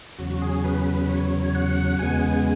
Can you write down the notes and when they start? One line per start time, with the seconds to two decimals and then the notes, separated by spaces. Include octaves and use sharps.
0.19 E2 C#3 F#3 F#4
0.42 G#4
0.64 B4
0.86 B4
1.09 C#5
1.55 F#5
1.99 E2 C#3 G#3 B3 G#5